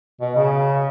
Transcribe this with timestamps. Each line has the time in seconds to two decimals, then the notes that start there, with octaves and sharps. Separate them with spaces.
0.21 B2
0.36 C#3